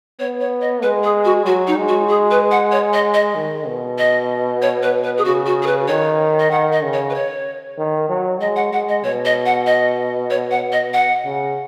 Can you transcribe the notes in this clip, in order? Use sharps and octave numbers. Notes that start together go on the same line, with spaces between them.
B3 C#5
C#5
D#5
G#3 B4
G#4
F#4
F#3 F#4
D#4
G#3
F#4
G#4
B4
F#5
C#5
D#5
D#5
D#3
B2
D#5
C#5
B4
B4
G#4
C#3 F#4
F#4
G#4
B4
D#3 C#5
D#5
D#3 F#5
D#5
C#3
C#5
B4
C#5
D#3
F#3
G#3 D#5
F#5
G#3 F#5
D#5
B2 C#5
D#5
F#5
D#5
C#5
F#5
D#5
F#5
C#3